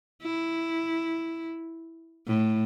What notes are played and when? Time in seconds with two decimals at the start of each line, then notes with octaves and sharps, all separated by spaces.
0.23 E4
2.27 A2